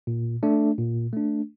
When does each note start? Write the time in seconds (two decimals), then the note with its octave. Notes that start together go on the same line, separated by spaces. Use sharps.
0.07 A#2
0.43 A3 D4
0.78 A#2
1.13 A3 D4